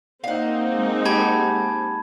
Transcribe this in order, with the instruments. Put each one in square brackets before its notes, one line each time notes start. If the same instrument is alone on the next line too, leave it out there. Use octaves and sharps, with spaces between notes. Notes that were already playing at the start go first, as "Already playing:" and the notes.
[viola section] A#3 C4 D#4 [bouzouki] F5 F#5
[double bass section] G#3
[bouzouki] G4 F#5 G#5 [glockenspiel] A5 B5 G#6